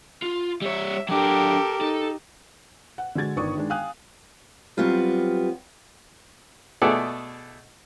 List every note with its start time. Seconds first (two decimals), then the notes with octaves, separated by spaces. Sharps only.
0.23 F4
0.62 G3 C#5 E5
1.09 F#3 D4 G4 A4 A#4
1.81 D#4 A4
2.98 F#5
3.15 D3 G#3 F#4 G#6 A6
3.36 G1 D#3 D4 D5 C#6 D#6
3.55 D#3 G#3 D4
3.70 F5 G5 G#5 D#6 F#6
4.77 F#3 G3 B3 C4 F4 G4
6.82 B2 A3 G#4 A4 D5 F#5